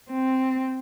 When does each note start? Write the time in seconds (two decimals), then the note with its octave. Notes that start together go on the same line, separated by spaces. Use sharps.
0.11 C4